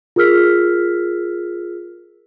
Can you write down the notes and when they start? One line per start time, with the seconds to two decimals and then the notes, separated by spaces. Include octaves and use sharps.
0.16 F4 G#4 A#4 E6 F6 B6